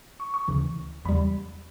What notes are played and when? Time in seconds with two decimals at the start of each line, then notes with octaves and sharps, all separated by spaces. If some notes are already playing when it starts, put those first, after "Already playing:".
0.20 C#6
0.34 C#6
0.48 D2 C#3 E3
1.05 E2 C#3 G3 B5